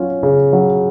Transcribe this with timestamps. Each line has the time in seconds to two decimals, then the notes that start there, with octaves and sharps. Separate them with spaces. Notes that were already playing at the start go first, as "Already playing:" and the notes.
Already playing: F#3 C#4 F4
0.23 C#3
0.53 F#3